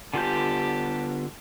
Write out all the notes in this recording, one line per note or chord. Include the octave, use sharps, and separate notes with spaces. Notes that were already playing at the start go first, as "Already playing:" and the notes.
D3 G3 B3 F4 G4 G#5 A5 G6